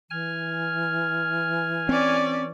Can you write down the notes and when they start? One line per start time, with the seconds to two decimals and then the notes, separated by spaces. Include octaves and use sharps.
0.10 E3 G#5 F6
1.89 C4 C#4 D5